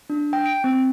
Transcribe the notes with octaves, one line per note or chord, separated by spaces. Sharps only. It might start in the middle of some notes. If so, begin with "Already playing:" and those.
D4
G5
D7
C4